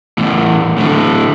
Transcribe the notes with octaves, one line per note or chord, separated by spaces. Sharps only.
E2 A2
A2 D3